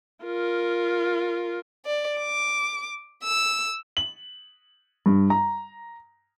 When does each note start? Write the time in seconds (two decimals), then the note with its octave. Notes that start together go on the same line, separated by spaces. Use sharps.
0.25 F4 A#4
1.85 D5
2.20 D6
3.24 E6
3.97 F#7
5.06 G2
5.30 A#5